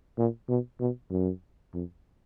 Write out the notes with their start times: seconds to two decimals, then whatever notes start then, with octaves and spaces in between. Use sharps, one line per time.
0.18 A#2
0.49 B2
0.80 B2
1.11 F#2
1.74 F2